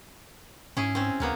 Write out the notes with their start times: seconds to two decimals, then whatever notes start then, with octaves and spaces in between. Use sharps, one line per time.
0.77 G#2 C#4 E4 G#4
0.95 C4 C#4
1.20 D2 C#3 A#3 B3